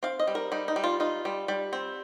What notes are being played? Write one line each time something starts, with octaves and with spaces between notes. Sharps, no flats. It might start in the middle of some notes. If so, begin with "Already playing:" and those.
C4 F5
D#5
G3
A#4
G3 D#4
D#4
G3
F4
D#4 F4
G3
G3
C4